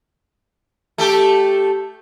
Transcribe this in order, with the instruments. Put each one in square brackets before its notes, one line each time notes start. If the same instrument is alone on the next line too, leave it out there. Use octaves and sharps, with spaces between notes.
[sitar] A3 G4 A4